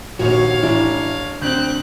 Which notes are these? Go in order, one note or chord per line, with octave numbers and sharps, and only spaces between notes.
A#1 D#2 F#4 C#5 F5
A1 D4 E4
D2 D3 C4 F#6 G6